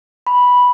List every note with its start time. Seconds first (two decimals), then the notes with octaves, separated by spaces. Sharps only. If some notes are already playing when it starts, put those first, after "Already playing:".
0.27 B5